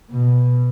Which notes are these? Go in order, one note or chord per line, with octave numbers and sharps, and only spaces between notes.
B2